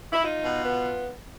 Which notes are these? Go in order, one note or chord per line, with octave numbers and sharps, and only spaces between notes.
E4
D#4 F4
B2
B3